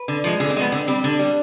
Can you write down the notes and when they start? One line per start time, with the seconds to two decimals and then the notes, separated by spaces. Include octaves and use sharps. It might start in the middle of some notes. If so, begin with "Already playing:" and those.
Already playing: B4
0.08 D3
0.24 F3 G#3
0.40 D3 G#4
0.50 C4
0.56 F3 G#3 B3
0.72 D3 C4
0.87 G3 C4
1.04 D3 D4
1.19 G3